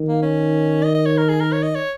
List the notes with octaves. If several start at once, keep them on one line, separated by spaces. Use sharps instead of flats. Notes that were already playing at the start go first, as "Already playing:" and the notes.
Already playing: D#3
A#3
C#4
D#5
D#5
C#5
A#4
G#4
A#4
C#5
D#5
C#5